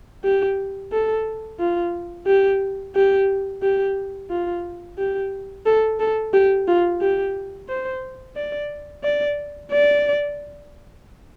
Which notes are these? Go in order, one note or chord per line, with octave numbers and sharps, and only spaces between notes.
G4
A4
F4
G4
G4
G4
F4
G4
A4
A4
G4
F4
G4
C5
D5
D5
D5